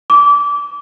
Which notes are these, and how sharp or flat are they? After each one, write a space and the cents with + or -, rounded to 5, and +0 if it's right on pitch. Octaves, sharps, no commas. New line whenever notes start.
D6 -25